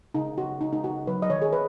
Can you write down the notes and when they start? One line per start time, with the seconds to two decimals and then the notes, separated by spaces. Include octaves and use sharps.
0.14 C#3 D#4
0.38 F#4
0.61 D#4
0.73 D#4
0.84 F#4
1.07 F#3 B4
1.22 D#5
1.30 D#3 C#5
1.42 G#4
1.53 B4